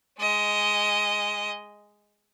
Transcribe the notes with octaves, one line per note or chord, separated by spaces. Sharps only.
G#3 D#5